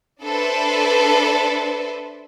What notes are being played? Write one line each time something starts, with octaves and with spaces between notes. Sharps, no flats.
D4 A4 B4 C5 D5 E5